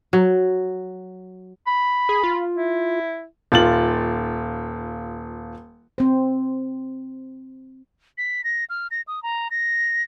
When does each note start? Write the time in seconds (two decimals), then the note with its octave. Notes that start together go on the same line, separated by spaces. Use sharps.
0.13 F#3
1.67 B5
2.09 G#4
2.24 F4
2.55 E4
3.52 D#1 F4 A6 F#7
5.98 C4 C5
8.18 B6
8.44 A#6
8.70 F6
8.91 A#6
9.07 D#6
9.23 A#5
9.51 A#6